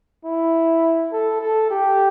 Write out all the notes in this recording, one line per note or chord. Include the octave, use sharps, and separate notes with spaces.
E4
A4
A4
G4